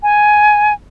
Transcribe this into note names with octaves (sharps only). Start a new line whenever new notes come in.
G#5